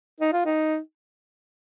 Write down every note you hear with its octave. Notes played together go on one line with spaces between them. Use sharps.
D#4
F4
D#4